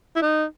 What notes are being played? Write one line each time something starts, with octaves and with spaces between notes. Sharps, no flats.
E4
D#4